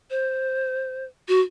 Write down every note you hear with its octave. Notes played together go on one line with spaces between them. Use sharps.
C5
F#4